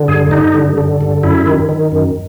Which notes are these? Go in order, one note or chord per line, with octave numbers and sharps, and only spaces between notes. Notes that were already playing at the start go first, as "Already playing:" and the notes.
Already playing: D3
G2 G#4
G2 D#4
D3
D3
G2
F#2 E4
D#3
D#3
F#2